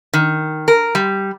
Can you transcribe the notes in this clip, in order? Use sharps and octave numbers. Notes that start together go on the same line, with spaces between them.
D#3
A#4
G3